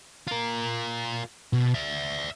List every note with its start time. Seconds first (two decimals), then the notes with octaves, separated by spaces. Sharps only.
0.28 F4 A#4
1.53 B2
1.74 D5 E5